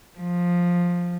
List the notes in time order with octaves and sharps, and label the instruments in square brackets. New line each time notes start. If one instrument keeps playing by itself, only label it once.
[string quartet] F3